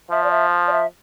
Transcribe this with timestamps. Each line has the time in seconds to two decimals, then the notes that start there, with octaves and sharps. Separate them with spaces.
0.11 F3 E5
0.24 D5
0.31 E5
0.68 D5
0.72 E5